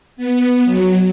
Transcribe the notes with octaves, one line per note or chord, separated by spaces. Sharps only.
B3
F#3